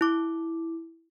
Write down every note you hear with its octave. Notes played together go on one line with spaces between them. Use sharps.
E4 D6